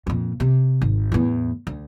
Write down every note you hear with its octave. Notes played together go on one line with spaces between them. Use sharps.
F2 A#2
C3
G#1
E2 A2
D2